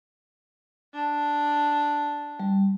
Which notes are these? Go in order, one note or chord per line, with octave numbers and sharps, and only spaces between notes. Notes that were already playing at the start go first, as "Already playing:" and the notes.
D4
G3